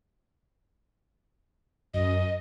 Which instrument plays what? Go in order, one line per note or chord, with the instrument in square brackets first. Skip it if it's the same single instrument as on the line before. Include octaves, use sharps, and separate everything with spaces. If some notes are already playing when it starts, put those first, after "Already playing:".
[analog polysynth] F#2 [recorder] D#5